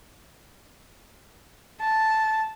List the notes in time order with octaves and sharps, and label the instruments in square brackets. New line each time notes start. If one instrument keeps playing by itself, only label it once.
[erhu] A5